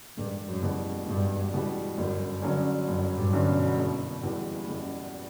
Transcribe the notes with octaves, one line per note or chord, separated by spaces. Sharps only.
E1 G2
F#2
E2 B2 G3
E1 G2
E2 B2 G3
G1 F#2
G2 D3 F#3 C#4
G1 F#2
G2
G2 D3 F#3 C#4
B2
F#1
E2 B2 G3
F#1